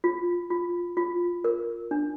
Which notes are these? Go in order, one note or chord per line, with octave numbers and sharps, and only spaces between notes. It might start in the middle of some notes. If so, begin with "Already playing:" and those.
F4
F4
F4
A#4
D4